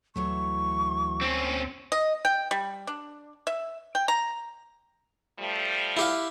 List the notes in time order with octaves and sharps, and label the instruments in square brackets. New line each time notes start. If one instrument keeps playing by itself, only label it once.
[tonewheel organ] D2 [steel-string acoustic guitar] E3 F#3 A3 [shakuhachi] C#6
[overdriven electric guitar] C4 C#4
[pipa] D#5
G5
G3
D4
E5
G5
A#5
[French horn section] F3 G3 A3
[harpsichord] E4 G4 F5